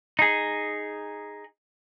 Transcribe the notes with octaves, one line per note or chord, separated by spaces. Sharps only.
D#4 G#4